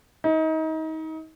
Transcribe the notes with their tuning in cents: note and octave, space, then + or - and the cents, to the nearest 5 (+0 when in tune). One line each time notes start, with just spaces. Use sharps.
D#4 +30